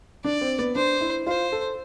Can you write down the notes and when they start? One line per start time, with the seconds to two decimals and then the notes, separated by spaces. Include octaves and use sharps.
0.24 D4 D5
0.41 C4
0.59 B3
0.75 D4 C5
1.01 E4
1.27 F4 C5
1.52 A4